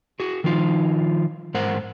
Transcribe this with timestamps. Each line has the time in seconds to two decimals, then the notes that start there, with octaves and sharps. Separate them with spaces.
0.20 F#4 G#4
0.44 D#3 F3 D#4 F4
1.54 G#2 A#4 C5 F#5